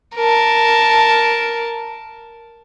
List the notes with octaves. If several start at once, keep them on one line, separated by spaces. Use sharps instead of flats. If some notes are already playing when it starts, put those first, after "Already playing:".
A#4 A5